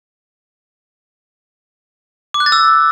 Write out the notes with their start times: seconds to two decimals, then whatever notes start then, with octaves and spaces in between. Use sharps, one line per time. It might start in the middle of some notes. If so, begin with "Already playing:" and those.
2.34 D6
2.40 F#6
2.46 A6
2.52 E6